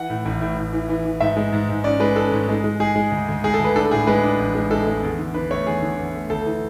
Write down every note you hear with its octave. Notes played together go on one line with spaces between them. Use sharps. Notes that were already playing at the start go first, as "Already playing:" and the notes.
Already playing: E3 F#5
A2
A1
A2
A2
E3
E3
E3
G#2 E5
G#3
G#2
G#2
C#4 D5
G#3 B4
C#4 A4
G#2
G#3
G#3
G#3 G#4
G#3
D2
D2
G#3 G#4
A4
D2
B4
D4 A4
A2 G#4
G#3 B4
D4
A1
G#3
G#3 A4
G#3
E2
D3
D3 B4
A3 C#5
E2 G#4
D3
E2
A3
D2 A4
E3